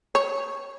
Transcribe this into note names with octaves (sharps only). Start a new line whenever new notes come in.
C#5